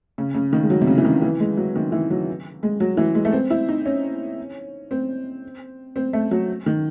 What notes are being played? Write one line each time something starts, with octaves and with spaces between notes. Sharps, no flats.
C#3
C#3
D#3
G#3
F#3
C3
C#3
E3
D#3
E3
G#3
F#3
D#3
E3
F#3
G#3
F#3
E3
G#3
A3
C4
E4
D#4
C#4
C4
C4
A3
F#3
D#3